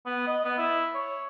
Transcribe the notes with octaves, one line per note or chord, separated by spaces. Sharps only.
B3
D#5
B3
E4
C#5